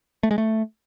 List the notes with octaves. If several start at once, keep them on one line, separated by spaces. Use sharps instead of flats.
A3
G#3
A3